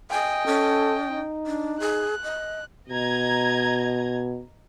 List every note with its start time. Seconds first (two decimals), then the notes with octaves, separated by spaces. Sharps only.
0.11 D#5 G5 G#5
0.47 C#4 A4
1.09 D#4
1.47 D4
1.80 G#4 F#6
2.24 D#5
2.89 B2 D#5 A#5 G#6